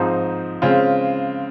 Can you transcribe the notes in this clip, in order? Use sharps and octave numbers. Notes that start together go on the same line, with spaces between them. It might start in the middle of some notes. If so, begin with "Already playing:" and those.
Already playing: G#2 F3 C4 D#4
C#3 G#3 C4 F4